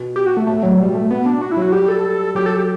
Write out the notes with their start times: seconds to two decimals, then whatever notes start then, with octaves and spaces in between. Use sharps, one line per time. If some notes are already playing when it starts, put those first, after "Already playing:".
Already playing: B2
0.16 G4
0.26 F#4
0.37 A3
0.47 A2 A3
0.63 A2 F#3
0.79 B2 G3
0.95 A3
1.11 B3
1.26 D4
1.41 F#4
1.51 E4
1.57 F#3
1.62 F#4
1.72 G3 G4
1.88 A4
2.35 F#3 G4
2.46 A4
2.57 G4